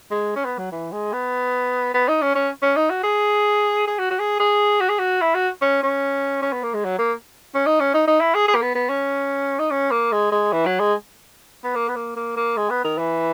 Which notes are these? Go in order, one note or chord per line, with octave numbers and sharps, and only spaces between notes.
G#3
C#4
B3
F#3
E3
G#3
B3
B3
D#4
C#4
C#4
C#4
D#4
F#4
G#4
G#4
F#4
F#4
G#4
G#4
F#4
G#4
F#4
E4
F#4
C#4
C#4
C#4
B3
A#3
G#3
F#3
A#3
C#4
D#4
C#4
D#4
D#4
E4
G#4
G#4
A#3
B3
B3
C#4
D#4
C#4
A#3
G#3
G#3
E3
F#3
G#3
B3
A#3
B3
A#3
A#3
A#3
G#3
B3
D#3
E3